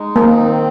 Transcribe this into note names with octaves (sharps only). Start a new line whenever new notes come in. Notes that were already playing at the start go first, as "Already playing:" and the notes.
Already playing: G#3 D#4
A#3 C4
D#3